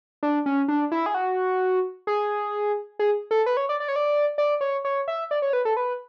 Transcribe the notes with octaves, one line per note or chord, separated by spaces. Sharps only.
D4
C#4
D4
E4
G#4
F#4
G#4
G#4
A4
B4
C#5
D5
D5
C#5
D5
D5
C#5
C#5
E5
D5
C#5
B4
A4
B4